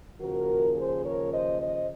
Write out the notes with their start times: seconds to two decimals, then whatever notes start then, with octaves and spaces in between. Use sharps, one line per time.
0.19 D#2 C#3 F3 F#4 A#4
0.76 G#4 C5
1.04 A#4 C#5
1.31 C5 D#5
1.59 C5 D#5